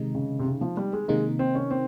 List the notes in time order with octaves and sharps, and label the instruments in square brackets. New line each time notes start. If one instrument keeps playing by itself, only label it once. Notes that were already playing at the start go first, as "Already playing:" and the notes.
Already playing: [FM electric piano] C3 D#3 G#3 D#4
[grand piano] C#3
C3
C#3
F3
G3
G#3
[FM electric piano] C3 D#3 A#3 D#4 [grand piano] G#3
[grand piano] C4
C#4
C4